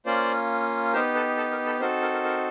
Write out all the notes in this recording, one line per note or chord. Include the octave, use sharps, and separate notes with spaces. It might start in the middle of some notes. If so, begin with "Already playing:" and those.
A#3 C#4 F4 C5 D5
B3 D#4 G4 A#4 C5
A4 B4
A4
A#4
A4 B4
C4 D#4 F#4 A4 A#4 C5
A#4
A#4
A#4